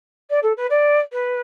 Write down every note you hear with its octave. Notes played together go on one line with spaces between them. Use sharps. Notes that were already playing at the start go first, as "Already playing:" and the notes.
D5
A4
B4
D5
B4